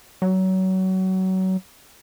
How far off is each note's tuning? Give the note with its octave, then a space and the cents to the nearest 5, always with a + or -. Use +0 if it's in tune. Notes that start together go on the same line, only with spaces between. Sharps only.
F#3 +25